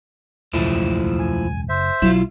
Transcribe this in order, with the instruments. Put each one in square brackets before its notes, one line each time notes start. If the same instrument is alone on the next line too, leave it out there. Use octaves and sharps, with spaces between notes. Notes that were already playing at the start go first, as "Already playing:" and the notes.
[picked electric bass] E1 C#2 F#2 [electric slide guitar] F3 A3 E4
[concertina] G#5
[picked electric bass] F#1 [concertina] C5 E5
[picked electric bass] B1 [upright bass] F#3 [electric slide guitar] E4 F4